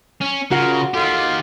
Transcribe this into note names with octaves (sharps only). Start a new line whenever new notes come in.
C#4
C#3 F4 F#4 A#4 F#5
D#3 F4 G4 A4